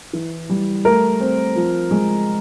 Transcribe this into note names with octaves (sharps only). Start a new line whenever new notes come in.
E3
G3
A3 A#4
C4
F3
G#3